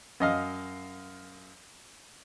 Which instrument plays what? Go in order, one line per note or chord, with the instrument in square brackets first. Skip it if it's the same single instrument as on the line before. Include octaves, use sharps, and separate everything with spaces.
[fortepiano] F#2 D#5 F5